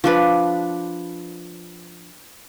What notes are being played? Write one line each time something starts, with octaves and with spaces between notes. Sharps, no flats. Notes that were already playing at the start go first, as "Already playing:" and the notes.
F3 D4 B4